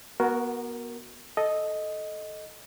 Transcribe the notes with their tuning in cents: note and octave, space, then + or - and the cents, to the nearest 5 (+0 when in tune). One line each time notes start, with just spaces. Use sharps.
B3 -30 F#4 +0 A#4 +0
A4 -10 D#5 +0